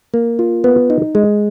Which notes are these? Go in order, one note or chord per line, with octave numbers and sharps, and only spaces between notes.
A#3
F4
B3
D#4
G#3